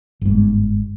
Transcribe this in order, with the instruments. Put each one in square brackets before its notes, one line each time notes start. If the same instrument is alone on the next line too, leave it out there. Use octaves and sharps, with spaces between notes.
[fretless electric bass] G1 G#2